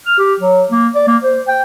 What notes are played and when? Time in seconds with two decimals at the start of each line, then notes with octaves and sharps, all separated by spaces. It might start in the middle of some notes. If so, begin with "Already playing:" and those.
0.06 F6
0.18 G4
0.40 F#3
0.71 A#3
0.95 D5
1.07 A#3
1.23 C5
1.48 G5